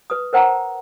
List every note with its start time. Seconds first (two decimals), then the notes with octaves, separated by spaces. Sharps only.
0.10 B4 D#6
0.33 A#4 C5 F#5 G5 A5 A#5